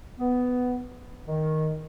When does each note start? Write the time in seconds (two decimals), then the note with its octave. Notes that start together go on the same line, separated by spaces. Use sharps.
0.19 B3
1.26 D#3